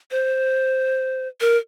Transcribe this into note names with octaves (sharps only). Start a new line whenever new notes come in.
C5
A#4